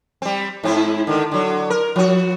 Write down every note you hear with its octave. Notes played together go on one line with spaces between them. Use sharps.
G3 C4
G#2 C4 E4
D3 D#3
D3 F#3
A#4
F3 F#4